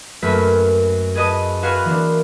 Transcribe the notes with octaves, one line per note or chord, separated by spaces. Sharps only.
F#2 A3 A#3 B4 B6
G#4 B4 D#5 A5 D#6
F#4 B4 F5 G#5 C6 F#6
E3 A#3 D4